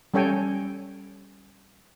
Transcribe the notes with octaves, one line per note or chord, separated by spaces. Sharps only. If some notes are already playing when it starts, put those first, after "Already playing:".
G3 C#4 A4 C#5 G5 G#5